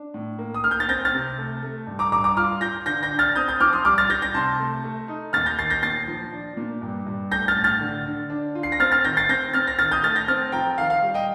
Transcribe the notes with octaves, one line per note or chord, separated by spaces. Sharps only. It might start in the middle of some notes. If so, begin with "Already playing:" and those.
Already playing: D4
A2
A#3
D#6
A#3 F6
G6
A6
C4 G6 A#6
F6 A6
C3
A3
A3
G2
A#5 D6
G2 A#5 D6
A#5 D6
F4 D6 F6
F4 G6 A#6
D3 G6 A#6
G6 A#6
D4
F6 A6
C4 D#6 G6
D#6 G6
F3 D6 F6
C6 D#6
G3 D6 F6
F6 A6
G3 G6 A#6
G6 A#6
C3 A5 C6
A3
A3
D#4
D#2 F6 A6
G6 A#6
D#3 A6 C7
G6 A#6
A#2 A6 C7
F3
D4
A#2
G2
G2
A3 G6 A#6
F6 A6
A2
F6 A6
D3
D3
D4
F4
C7
A#6
C4 F6 A6
F6 A6
D#3 G6 A#6
A6 C7
C4 G6 A#6
C4 F6 A6
A#6
D#3 F6 A6
D#6 G6
A3 F6 A6
G6 A#6
C4 F6 A6
F3 G5 A#5
D#3 F5
F5
G3
D#5 G5